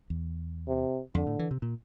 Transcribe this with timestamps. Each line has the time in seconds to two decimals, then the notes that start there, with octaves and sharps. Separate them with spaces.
0.10 E2
0.68 C3
1.15 F2 D3
1.27 A2
1.39 E3
1.51 C3
1.62 A#2